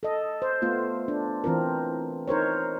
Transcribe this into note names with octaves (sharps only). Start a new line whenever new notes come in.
A4 D#5
C5
A3 B3 F4
D4
E3 C4 F4 A#4
D#4 A#4 C5 C#5